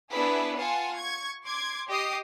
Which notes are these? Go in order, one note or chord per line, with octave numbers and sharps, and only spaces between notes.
B3 D4 E4 G#4 B4
F4 F#5 G#5 A5
C#6 G#6
C6 D6 G#6
G4 D#5 D#6 C7